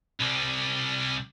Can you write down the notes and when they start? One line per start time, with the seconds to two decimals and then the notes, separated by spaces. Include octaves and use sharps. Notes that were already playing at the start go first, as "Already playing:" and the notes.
0.20 C2 G3